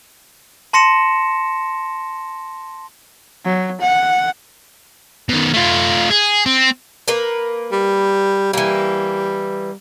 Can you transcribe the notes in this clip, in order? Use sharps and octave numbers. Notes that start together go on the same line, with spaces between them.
A5 C6 A#6 C#7 E7
F#3
F#5
B2 D#3
A3 F4
G#4
C4
A#3 A#4 B4
G3
E3 G3 A#3